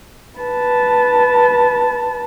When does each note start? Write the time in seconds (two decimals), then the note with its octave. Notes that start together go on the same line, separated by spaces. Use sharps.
0.39 B4 A5